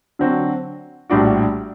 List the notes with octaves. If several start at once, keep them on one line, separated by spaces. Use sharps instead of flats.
D3 F#3 C4 F#4
A#1 A2 G3 D4 F#4